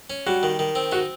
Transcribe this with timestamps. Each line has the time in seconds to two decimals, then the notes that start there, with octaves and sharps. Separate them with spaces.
0.10 C#4
0.26 G3 F#4
0.43 D#3
0.59 D#3
0.75 C4
0.92 D#4 F#4